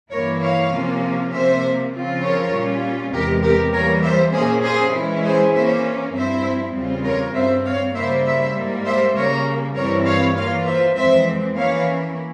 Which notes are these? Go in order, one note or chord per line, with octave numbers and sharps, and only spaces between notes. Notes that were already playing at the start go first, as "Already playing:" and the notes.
G2 E3 A#3 E4 A#4 C#5
C#5 F5
C3 F3 A#3 C#4 F4
C3 F3 A#3 C5 E5
C#3 F3 C4 F4
A#4 C#5
A#2 G3 C#4 F4
E2 C3 E3 G#3 G4 A#4
G4 A#4
E3 G3 A#3 A#4 C#5
C5 E5
A#2 F3 A#3 C#4 G#4 C5
G#4 C5
E3 G#3 C#4 E4
G#4 C5
E3 A#3 C#4 C5 E5
G2 F3 C4 E4 C5 E5
E2 C#3 G3 C4 F4
A#4 C#5
G2 G3 C4 C5 E5
C#5 F5
C#3 G3 A#3 E4 C5 E5
C5 E5
G#2 G3 A#3
C5 E5
C#3 G3 A#3 A#4 C#5
G2 E3 G3 C4 E4 A#4 C#5
C#5 F5
E3 A#3 F4 C#5 F5
C5 E5
F2 E3 G#3 C4 C5 E5
E3 A#3 C#4 E4 C#5 F5